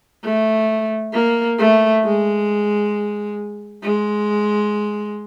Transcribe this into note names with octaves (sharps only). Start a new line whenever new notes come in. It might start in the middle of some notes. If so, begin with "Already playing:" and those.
A3
A#3
A3
G#3
G#3